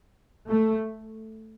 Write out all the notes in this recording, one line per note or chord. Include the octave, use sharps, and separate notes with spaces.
A3